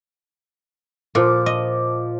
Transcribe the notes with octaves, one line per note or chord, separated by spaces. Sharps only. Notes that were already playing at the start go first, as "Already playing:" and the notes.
A#2 F3 D6
D#5